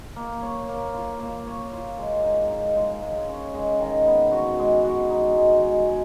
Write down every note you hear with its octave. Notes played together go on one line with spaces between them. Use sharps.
A#3
C#5
A#3
F4
A#3
C#5
F4
G#3
D#4
D#4
G#3
G#3
C#4
G#3
D#3
B3
F#4
G#3
F#4
D#4
G#3
G#3
G#3